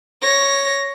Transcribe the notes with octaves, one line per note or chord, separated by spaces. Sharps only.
C#5 A#6